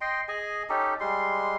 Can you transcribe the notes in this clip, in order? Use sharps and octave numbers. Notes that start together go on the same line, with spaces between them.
D#5 G5 C6
G#4 D#5 G#5
C#4 D#4 G4 A4
G3 G#3 C6